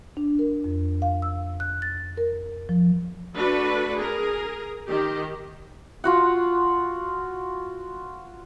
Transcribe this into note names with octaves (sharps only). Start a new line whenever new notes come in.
D4
A#4
F2
F5
E6
F#6
A6
A#4
F3
A3 D4 F#4 A4 B4
G#4 A#4
D#3 G4
F4 F#4 F#5